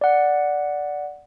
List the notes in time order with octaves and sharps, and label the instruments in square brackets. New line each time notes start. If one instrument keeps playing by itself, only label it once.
[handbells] D5 F#5